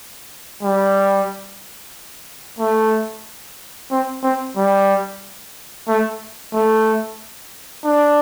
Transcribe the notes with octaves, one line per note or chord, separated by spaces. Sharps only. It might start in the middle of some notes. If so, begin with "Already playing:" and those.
G3
A3
C4
C4
G3
A3
A3
D4